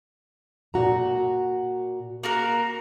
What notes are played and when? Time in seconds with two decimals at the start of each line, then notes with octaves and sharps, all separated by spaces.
0.74 A#2 F#4 A#5
2.23 A#3 F#4 A#4